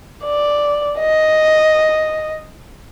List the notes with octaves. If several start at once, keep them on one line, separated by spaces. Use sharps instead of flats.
D5
D#5